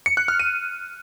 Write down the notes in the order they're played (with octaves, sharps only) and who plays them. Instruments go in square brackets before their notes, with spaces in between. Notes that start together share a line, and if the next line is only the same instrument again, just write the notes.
[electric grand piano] C#7
F#6
F6
D#7